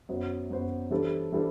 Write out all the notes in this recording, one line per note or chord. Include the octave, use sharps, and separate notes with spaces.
F#2 F#3 B3 F#4 C5
F#2 F#3 B3 F#4 C5
E3 G3 D4 A4 C5
E3 G3 D4 A4 C5